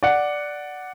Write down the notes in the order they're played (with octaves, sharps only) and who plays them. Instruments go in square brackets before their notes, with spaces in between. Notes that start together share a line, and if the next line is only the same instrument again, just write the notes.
[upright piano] D5 F#5